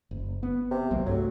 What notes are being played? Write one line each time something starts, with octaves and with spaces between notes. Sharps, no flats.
F#1
B3
C3
C2 F#3 A#3
C2 G2 F#3 A3